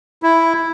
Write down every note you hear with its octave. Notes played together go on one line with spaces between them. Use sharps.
E4